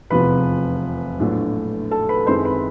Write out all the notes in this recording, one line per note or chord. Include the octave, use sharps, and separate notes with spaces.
F1 E2 C3 F3 B4 B5
A#1 A2 F#3 B3 D4
A4 A5
B4 B5
F#2 D#3 G#3 C4 E4 C5 C6
B4 B5